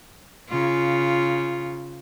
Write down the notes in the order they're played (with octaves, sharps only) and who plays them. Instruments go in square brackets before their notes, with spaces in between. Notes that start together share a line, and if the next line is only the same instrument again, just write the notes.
[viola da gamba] C#3 F4